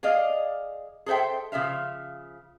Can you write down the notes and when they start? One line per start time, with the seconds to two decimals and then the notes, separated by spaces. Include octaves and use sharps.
0.03 G#4 D5 D#5 F5
1.06 G#4 A4 C5 E5 G5
1.52 C#3 F3 E5 F5